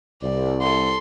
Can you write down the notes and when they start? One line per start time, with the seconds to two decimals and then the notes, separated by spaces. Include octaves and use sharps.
0.22 C2 D5
0.62 A4 C6